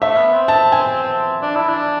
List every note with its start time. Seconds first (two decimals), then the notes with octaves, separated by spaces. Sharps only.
0.01 A3 E5
0.17 B3
0.33 C4
0.48 A5
0.72 G#5
1.42 D4
1.55 E4
1.68 D4